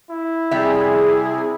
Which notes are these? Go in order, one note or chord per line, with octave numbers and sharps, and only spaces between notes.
E4
C3 G3 G#4 E5